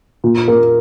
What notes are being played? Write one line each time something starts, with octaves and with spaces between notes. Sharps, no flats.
A#2
A#3